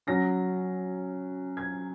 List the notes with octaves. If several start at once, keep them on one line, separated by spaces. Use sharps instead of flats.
F#3 C#4 A#6
G#6